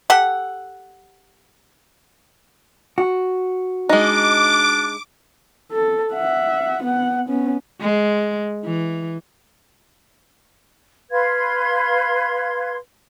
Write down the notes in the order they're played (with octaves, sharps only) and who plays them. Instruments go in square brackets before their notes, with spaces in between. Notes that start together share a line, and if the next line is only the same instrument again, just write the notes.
[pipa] G4 A4 F#5
[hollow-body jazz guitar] F#4
[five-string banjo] G#3 D#4 [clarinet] D4 [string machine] D6
[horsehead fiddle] A4
E5 F#5
B3 F#5
B3 C#4
[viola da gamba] G#3
E3
[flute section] B4 F5 C6 G#6